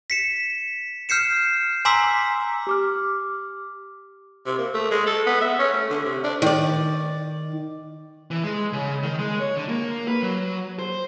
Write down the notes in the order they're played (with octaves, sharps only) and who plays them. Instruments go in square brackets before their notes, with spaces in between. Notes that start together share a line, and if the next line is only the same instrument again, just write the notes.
[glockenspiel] B6 C#7 E7
F6 G6 C7 C#7 E7
G#5 A#5 C6 D6 E6 B6
[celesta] G4 D6 F6
[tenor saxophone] C3
A#3
A3
G#3
A4
B3
E5
C#4
A3
D3
C3
D4
[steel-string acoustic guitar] D#3 D5
[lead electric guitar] E3
G#3
C#3
D#3
G#3
C#5
D3
A#3
B4
F#3
C5